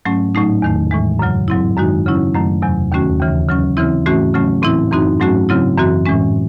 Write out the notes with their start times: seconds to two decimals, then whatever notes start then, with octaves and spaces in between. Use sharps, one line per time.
0.05 G#2 F#3 A3 C#4
0.35 A2 F#3 A3 D#4
0.62 E2 D#3 A3
0.91 A2 E3 G#3
1.19 F#2 C#3 F#3
1.48 G#2 F#3 C4 E4
1.76 F#2 D#3 G#3 D#4 F#4
2.06 C#3 F#3 C#4 E4
2.35 F#2 D#3 F#3 A3
2.62 E2 C3 F#3
2.92 D#2 D#3 A3 C#4 F#4
3.20 D#2 C#3 E3
3.49 C#3 F#3 C#4
3.77 C#3 E3 C4 E4
4.06 G#2 E3 A3 C#4 F#4
4.34 C#3 F#3 A3 C#4
4.62 A2 E3 C4 E4
4.91 F#2 E3 C4 D#4 F#4
5.20 G#2 F#3 A3 C#4 F#4
5.49 C#3 F#3 C4 E4
5.78 F#2 E3 C4 F#4
6.06 A2 E3 G#3 C#4